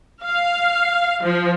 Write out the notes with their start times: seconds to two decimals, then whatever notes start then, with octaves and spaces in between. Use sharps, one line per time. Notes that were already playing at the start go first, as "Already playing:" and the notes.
0.23 F5
1.22 F3